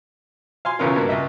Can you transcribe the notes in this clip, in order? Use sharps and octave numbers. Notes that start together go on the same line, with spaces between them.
F5 G#5 C6
B1 E2 C#3 C#4 F4 A#4
G2 B2 A#3 B3
C#2 D#5 E5